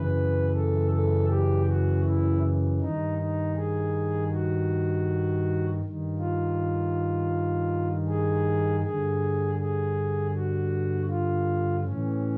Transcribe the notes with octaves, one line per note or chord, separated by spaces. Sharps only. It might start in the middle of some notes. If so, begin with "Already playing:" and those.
Already playing: F#2 C#3 E3 B4
A4
A4
G4
F#4
E4
G2 D#3 D#4
D#4
G#4
F#4
G2 D#3
F4
G#4
G2 D3 G#4
G#4
F#4
F4
A2 E3 C#4